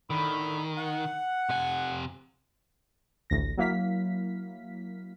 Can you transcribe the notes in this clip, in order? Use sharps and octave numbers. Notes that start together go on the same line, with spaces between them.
A2 D3 D#3 B5
F#5
C3 G#5
A1 D2 A#6
F#3 A#3 E4 F5 B6